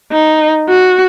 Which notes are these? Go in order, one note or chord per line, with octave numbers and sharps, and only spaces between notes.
D#4
F#4